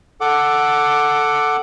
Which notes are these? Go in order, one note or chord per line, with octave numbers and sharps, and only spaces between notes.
A4 F#5 D6